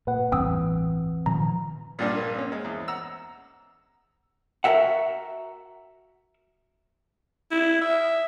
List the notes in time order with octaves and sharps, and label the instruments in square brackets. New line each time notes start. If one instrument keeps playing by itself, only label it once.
[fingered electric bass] A#2 [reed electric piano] B4 F#5
[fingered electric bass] A1 E2 G2 [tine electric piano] E3 C4 [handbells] G5 D#6 E6
[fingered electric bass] A#2 D#3 F3 [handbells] A#5
[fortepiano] A#1 G2 A#2 [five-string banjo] G3 D4
[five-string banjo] A#4
C4 C#4
[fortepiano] G#3
E2
F#5 A#5 E6
[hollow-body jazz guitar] F#4 A#4 E5 F#5
[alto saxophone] E4
E5